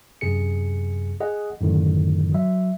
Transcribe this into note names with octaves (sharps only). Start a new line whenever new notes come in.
F#2 C3 G#4 C#7
G#4 D#5 F#5
F#2 A2 D3 D#3
F#3 E5